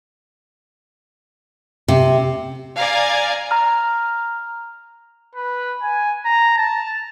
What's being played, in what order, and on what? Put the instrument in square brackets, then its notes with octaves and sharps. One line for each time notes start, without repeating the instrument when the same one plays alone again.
[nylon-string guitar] C3
[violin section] D5 F5 G#5 A#5
[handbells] A#5 F6
[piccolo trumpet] B4
G#5
A#5
A5